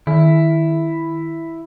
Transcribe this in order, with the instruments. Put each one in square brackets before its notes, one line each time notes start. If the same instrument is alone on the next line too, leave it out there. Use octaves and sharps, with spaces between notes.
[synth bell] D#3 [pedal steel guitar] E4